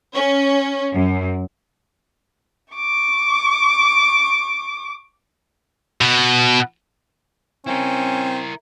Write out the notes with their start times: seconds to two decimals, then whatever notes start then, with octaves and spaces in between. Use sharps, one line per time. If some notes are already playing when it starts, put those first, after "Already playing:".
0.14 C#4
0.93 F#2
2.74 C#6 D6
6.01 B2
7.67 C4 C#4 E4 A#4